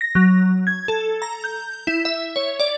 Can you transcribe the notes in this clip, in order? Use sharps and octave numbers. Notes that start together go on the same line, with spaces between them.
A#6
F#3
G#6
A4
A#5
G6
E4
E5
C#5
D5